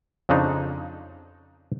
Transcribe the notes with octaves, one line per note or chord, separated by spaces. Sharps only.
F2 C#3 F3 D4 D#4